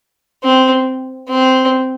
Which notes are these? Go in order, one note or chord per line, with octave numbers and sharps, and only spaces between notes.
C4
C4